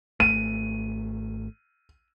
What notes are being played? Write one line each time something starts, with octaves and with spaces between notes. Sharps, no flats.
G#1 A3 D#7